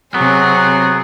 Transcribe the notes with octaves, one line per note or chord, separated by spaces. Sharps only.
C3 F#3 B3 C4 G#4